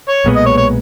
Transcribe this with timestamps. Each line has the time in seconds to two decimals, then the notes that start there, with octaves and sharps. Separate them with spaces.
0.08 C#5
0.24 B1 A#2 G#3 B3
0.36 D#5
0.46 C#5
0.58 C#5